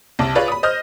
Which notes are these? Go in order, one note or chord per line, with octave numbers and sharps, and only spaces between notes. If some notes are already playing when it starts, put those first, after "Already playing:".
C2 A5 D6
F4 G#4 B4 C#5 D5 F5
B5 D#6
C5 D#5 D#6 F6 G6 A#6